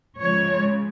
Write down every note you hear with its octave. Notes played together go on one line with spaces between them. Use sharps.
C#3 F3 G#3 C#5